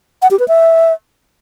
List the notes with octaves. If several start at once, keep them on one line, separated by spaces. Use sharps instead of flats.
F#5
G4
B4
E5